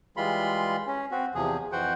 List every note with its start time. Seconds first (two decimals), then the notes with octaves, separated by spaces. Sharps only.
0.17 E3 G3 G#3 F4 B5 C6
0.87 C#4
1.11 C4 F#4
1.35 E2 C3 F3 G#4
1.72 F2 E3 F#4 C5 F#5 G5